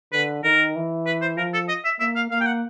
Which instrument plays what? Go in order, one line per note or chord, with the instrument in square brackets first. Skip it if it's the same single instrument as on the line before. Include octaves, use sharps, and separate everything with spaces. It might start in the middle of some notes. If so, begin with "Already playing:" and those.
[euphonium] D3 [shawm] B4
[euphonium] D#3 [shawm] A#4
[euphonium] E3
[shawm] B4
C5
[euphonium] F3 [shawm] A#4
[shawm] A4
D#5
E5
[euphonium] A#3 [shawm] E5
[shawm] F5
[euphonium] A#3 [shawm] F5
[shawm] G5
F#5